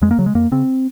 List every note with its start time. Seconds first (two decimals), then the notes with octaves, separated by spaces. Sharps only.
0.02 F2 G#3
0.11 A#3
0.18 C#3 F#3
0.26 G#3
0.35 F2 A#3
0.52 C#3 C4